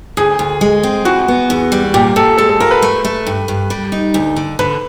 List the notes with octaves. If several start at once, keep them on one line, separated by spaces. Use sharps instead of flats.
D2 G#4
D2
G#3
C4
E3 F#4
B3
E2
G3
A#2 G4
A#2 A4
G#3 A4
A4
F4 A#4
B4
A3
A3
G2
G2
G3
D#4
D2
D3
D3 B4